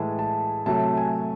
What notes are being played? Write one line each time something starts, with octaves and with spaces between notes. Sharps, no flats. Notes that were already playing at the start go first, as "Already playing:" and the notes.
Already playing: A2 E3 G#3 A5
A5
C3 F#3 A3 A5
G#5